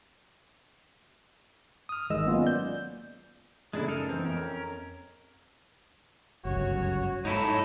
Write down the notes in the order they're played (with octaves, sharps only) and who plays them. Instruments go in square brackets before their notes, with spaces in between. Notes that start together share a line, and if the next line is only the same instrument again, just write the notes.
[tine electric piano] D#6 F6
G#1 D#3 G#3 D#5 E6
F#3 A#3 B3 C#4 F4
D5 G6
[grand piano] F#2 C#3 A3 [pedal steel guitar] G#3 D4 E4
[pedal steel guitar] D#4 A4 A#4
[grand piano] E3 [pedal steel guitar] C4
[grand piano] F2 [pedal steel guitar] C#4 A#4
[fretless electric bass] G1 C#2 F#2 [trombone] F#4 [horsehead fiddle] C#5
[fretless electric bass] G#2 [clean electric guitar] D#4 E4 A4 [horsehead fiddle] C#5